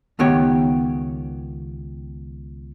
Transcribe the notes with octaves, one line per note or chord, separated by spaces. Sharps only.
C#2 D#3 B3 G4 C#5